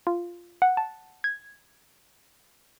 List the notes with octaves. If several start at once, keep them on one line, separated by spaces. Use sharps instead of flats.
F4
F#5
A5
G#6